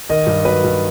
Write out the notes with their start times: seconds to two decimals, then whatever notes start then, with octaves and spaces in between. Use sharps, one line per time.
0.10 D#3 D#5
0.27 G2
0.45 F#3 B4
0.64 G2